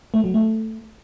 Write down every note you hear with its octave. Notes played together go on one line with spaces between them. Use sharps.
A3
F#3
A3